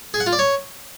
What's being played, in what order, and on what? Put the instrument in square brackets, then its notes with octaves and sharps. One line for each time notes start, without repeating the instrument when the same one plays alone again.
[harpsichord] G#4
F#5
F4
D5
C#5